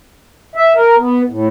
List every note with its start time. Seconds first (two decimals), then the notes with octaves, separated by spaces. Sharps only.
0.56 E5
0.75 A#4
0.98 B3
1.29 A2